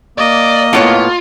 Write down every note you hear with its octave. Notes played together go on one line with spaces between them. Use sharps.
A#3 D5 D#5
A2 B3 F4 C#5